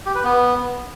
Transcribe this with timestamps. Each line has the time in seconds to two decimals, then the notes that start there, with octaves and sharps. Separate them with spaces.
0.06 G4
0.15 B4
0.24 B3